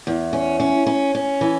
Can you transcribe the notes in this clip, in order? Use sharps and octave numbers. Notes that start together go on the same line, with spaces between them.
E2
C#4
C#4
C#4
C#4
E3